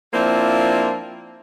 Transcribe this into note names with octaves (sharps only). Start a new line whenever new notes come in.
F3 A#3 C4 D4 E4 F4